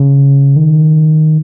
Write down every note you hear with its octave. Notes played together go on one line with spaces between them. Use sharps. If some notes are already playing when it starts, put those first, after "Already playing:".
Already playing: C#3
D#3